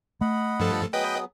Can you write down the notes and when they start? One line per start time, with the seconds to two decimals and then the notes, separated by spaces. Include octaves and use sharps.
0.21 A3 D#5 F#5 B5
0.60 G2 F3 A4
0.93 F#3 B3 G#4 B4 D#5 G5